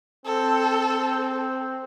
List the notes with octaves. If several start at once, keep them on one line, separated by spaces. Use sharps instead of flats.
C4 A4